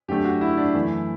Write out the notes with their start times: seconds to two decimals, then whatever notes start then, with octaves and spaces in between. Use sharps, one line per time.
0.08 F#2 D3 A3 G4
0.25 F#4
0.41 E4
0.58 D4
0.74 F#2 E3 A3 E4